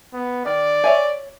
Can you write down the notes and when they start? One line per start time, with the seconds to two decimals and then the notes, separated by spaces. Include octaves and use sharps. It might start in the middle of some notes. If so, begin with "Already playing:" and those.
0.13 B3
0.46 D#3 D5
0.84 C#5 E5 G#5